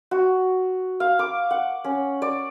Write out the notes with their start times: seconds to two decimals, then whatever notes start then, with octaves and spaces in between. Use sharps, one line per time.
0.11 F#4
1.00 F5
1.19 D6
1.51 F#5
1.84 C#4
2.22 D5